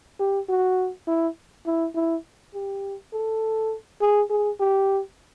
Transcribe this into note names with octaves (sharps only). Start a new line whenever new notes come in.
G4
F#4
E4
E4
E4
G4
A4
G#4
G#4
G4